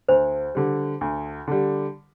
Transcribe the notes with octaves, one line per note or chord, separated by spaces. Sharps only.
D2 C5
D3 G3
D2
D3 G3